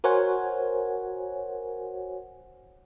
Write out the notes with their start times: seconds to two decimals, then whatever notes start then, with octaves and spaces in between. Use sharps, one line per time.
0.04 F#4 A#4 C5 C#5 F#5 G#5